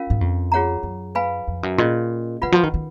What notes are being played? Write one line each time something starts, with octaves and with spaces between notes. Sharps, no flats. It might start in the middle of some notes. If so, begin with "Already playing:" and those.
Already playing: C#4 F4 A#4 F5
G#2
F2
F4 G#4 C#5 F#5 A#5
F#2
B4 F5 G#5 B5
F2
F#2
A#2 C#4 F4 G#4 D#5
C#3 F4 B4 F#5 B5
F3
D#3
D#3